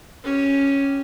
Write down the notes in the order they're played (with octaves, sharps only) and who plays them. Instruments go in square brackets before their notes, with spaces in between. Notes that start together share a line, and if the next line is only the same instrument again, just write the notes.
[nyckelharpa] C#4 G4